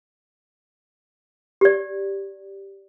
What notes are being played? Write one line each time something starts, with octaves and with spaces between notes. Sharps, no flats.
G4 D5